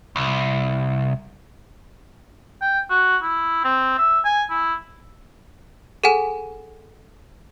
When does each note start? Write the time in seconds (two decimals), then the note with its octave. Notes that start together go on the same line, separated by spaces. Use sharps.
0.16 C2
2.61 G5
2.90 F#4
3.22 E4
3.64 C4
3.98 E5
4.25 G#5
4.50 E4
6.04 G#4 A4 F#5 G#5 E7